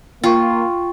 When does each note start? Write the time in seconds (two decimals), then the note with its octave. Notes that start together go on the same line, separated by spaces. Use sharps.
0.24 A#3 F4 G5 C#6